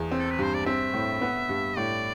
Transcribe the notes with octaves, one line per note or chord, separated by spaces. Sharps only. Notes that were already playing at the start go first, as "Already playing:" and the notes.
Already playing: E2
C4
A4
B4
G2 C5
D5
C4 E5
A2
B3
G2
A2 D5